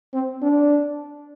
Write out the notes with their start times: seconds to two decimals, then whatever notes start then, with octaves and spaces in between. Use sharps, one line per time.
0.14 C4
0.42 D4